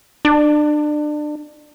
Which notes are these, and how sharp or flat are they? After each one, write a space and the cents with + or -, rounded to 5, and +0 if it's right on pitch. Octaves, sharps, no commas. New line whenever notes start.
D4 +30